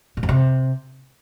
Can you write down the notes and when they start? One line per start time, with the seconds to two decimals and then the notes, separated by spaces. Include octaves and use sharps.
0.17 A#2
0.23 F2
0.29 C3